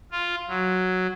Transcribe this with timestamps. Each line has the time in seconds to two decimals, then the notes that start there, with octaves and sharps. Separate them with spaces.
0.12 F4
0.48 F#3